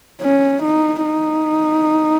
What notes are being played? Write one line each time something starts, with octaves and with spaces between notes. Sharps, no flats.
C#4
D#4
D#4